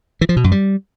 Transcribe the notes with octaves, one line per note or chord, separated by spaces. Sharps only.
E3
F3
B2
F#2
G3